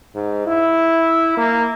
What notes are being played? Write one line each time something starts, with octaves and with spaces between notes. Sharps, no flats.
G#2
E4
A#3